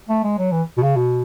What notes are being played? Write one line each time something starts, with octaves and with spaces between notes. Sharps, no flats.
A3
G#3
F#3
E3
B2
C#3
B2